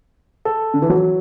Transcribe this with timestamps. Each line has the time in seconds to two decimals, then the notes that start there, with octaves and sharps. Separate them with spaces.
0.45 A4
0.74 D3
0.82 E3
0.89 F#3